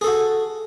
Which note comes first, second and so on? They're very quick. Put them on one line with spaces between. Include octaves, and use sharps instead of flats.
G#4 A4 F#4